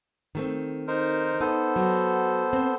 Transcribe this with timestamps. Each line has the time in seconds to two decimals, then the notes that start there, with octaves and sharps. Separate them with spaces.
0.35 D#3 A3 C4
0.88 D#4 A#4 C5
1.41 B3 D#4 A4 C5
1.76 F#3
2.53 C4